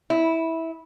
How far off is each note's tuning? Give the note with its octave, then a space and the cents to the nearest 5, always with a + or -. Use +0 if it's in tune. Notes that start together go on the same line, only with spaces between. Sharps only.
E4 -15